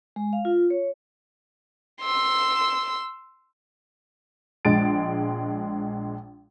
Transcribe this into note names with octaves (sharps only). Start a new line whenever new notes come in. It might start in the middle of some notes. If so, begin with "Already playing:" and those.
G#3
F5
F4
C#5
C6 E6
A#1 G#3 A6 D7